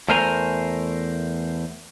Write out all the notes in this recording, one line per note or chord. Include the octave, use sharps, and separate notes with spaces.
E2 A3 A#4 C5 G#5 A#5